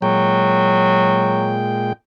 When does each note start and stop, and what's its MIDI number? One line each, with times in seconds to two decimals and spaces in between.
0.02 1.93 46
0.02 1.58 54
0.02 1.93 56
0.02 1.93 79